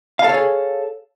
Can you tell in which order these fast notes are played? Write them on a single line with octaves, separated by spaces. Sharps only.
F5 A4 C#5 G#4